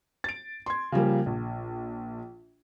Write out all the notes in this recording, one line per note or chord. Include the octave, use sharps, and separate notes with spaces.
A6 D7
C6 G#6
C#3 F3 G3 A#3
A#1